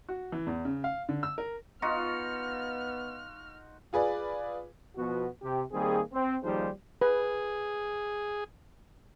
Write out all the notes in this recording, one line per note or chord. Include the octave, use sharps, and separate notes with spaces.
F#4
E3
E2
C#3
F5
D3
E6
A#4
B3 D#4 F4 F#4 F6
F4 G#4 B4 D5
B2 F3 B3 F#4
C3 G4
D#3 G3 A#3 C4 G#4
C4
D#2 F3 G3 D#4 G#4 C5
G#4 B4